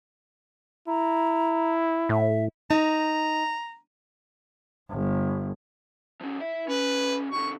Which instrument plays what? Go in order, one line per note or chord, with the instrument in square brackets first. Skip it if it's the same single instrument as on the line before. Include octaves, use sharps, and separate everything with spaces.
[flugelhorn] E4 [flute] A#5
[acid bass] A2 [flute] E5
[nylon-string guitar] D#4 [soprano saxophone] A#5
[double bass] G1
[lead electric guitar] F3 C#4
E4 E5
[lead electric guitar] B1 C#4 [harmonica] B4
[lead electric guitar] B2 D3 [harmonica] C#6